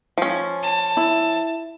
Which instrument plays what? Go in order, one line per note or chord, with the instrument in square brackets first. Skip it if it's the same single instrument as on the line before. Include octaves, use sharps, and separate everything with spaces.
[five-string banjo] F3 C#4
[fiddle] A5
[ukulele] E4